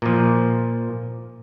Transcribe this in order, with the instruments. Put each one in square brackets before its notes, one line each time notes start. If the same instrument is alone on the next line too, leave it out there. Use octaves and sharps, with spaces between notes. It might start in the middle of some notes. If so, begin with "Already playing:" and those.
[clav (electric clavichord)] A#2 F3